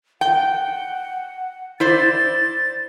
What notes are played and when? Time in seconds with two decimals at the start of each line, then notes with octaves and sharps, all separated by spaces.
0.21 F#5 G5
1.80 E4 C5 D5 A6